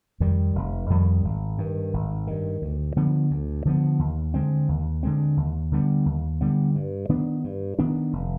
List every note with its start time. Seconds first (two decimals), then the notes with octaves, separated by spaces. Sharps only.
0.20 F2 D#3 G3
0.55 F1
0.90 F2 D#3 G3
1.25 G#1
1.58 G2 D#3
1.93 G#1
2.27 G2 D#3
2.62 D2
2.96 D3 F3 B3
3.31 D2
3.65 D3 F3 B3
3.99 D#2
4.34 D3 G#3 C4
4.68 D#2
5.03 D3 G#3 C4
5.37 D#2
5.72 D3 G3 B3
6.06 D#2
6.41 D3 G3 B3
6.75 G2
7.09 D#3 B3 D4
7.44 G2
7.79 D#3 B3 D4
8.13 F1